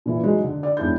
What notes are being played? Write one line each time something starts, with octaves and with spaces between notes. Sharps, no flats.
A#2 E3
F#3 G#3 D#4
D3
D5
E1 D4 E4 G6